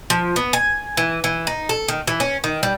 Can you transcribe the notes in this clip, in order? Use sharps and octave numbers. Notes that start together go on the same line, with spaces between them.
F3
B3
G#5
E3
E3
D#4
A4
D#3
E3
C#4
D#3
G3